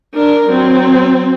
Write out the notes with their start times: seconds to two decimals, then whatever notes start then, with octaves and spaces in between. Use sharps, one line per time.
0.14 D4 A#4
0.49 F#3 C4